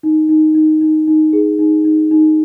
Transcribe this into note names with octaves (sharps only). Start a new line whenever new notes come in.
D#4
D#4
D#4
D#4
D#4
G#4
D#4
D#4
D#4